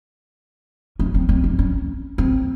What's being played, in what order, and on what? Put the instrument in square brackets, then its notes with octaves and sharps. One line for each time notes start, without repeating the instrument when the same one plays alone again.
[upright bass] C#4
C4
C4
C4
C#4
C4